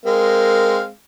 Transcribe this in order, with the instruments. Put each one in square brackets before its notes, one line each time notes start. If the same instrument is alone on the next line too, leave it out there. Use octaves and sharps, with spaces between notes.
[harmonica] G#3 C4 F5 [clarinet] A#4